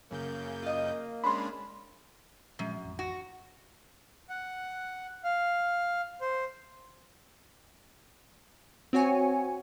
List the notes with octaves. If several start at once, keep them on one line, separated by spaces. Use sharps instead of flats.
F#2 C#3 A#3 G6
F4 D#5
G#3 C#4 D4 B5 C6
F#2 A#2 F3 G#3
A1 F2
F#4
F#5
F5
C5
C4 F#4 C#5 G#5 C#7